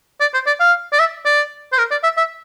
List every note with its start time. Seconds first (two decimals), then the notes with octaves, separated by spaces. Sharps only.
0.21 D5
0.34 C5
0.47 D5
0.60 F5
0.93 D5
1.00 E5
1.26 D5
1.73 C5
1.78 A#4
1.91 D5
2.04 E5
2.17 E5